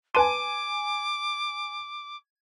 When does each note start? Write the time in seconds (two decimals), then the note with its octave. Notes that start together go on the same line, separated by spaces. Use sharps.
0.15 B4 G#5 A5 C6 D6 D#7